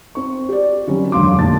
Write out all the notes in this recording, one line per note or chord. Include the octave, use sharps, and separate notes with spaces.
C4 C#6
G4 D5
D#3 F#3 G3 C4 C#4
E1 F#2 D3 F5 C6 D6
F1 A#2 D#4 A5 A6